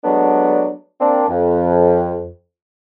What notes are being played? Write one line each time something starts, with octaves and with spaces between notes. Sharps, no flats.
F#3 G#3 A3 B3 D4
A#3 C4 D4
F2